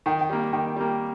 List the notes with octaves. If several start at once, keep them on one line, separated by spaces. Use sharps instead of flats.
D#3 G5
G5
G3 A#3
D#3 G5
G3 A#3